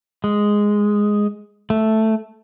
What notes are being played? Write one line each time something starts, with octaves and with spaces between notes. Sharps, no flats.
G#3
A3